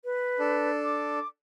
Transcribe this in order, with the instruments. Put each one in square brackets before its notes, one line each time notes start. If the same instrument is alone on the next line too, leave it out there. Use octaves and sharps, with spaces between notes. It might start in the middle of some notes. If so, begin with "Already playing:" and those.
[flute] B4
[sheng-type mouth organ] D4 A4
[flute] D6